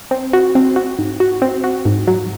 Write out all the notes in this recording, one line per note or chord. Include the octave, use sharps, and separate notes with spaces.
C4
F#4
C4
F#4
G#2
F#4
C4
F#4
G#2
F#3